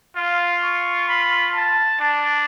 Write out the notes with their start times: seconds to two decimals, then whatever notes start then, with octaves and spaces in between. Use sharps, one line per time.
0.16 F4 F5
0.64 C#6
1.09 B5
1.55 A5
2.00 D4 A5